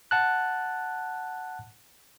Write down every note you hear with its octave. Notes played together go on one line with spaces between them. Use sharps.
F#5 A5 F#6